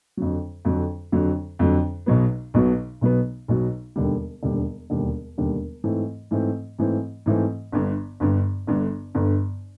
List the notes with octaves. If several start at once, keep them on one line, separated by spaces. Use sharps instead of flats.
F2 D3 F#3
F2 D3 F#3
F2 D3 F#3
F2 D3 F#3
B1 B2 F#3 B3
B1 B2 F#3 B3
B1 B2 F#3 B3
B1 B2 F#3 B3
E1 D#2 D3 G3
E1 D#2 D3 G3
E1 D#2 D3 G3
E1 D#2 D3 G3
G#2 E3 A3 C4
G#2 E3 A3 C4
G#2 E3 A3 C4
G#2 E3 A3 C4
G1 G2 D3
G1 G2 D3
G1 G2 D3
G1 G2 D3